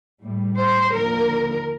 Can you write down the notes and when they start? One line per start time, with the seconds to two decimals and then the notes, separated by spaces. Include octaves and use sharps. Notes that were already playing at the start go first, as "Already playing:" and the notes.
0.22 A2 G3
0.56 C5
0.91 D#2 D3 F3 A#4